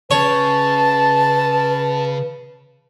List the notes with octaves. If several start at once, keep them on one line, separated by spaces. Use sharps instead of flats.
C#3 B4 C#5 A5